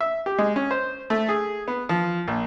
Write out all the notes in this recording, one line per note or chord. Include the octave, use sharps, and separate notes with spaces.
E5
G4
G#3
C#4
C5
A3
G#4
B3
F3
A#1